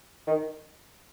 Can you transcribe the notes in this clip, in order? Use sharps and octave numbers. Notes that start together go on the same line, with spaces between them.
D#3